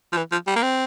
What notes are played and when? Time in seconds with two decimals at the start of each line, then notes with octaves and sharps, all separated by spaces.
0.12 F3
0.17 E3
0.32 F3
0.47 G3
0.56 A#3
0.63 C4